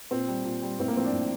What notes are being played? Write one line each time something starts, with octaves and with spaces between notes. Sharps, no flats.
A#2 C4
G3
A#2
G3
A2 C4
A#3
F3 C4
D4
A2